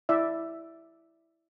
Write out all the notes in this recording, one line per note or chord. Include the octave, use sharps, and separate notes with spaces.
E4 D5 E5